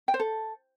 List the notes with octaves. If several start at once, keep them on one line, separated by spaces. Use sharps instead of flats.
G5
C5
A4